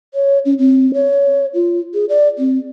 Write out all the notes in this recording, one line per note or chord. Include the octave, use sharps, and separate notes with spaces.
C#5
C#4
C4
C#5
F4
G#4
D5
C4